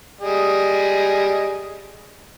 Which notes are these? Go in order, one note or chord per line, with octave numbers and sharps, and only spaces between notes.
G3 G#4 D#5